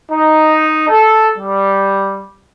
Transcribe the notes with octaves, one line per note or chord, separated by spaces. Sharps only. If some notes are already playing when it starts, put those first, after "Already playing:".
D#4
A4
G3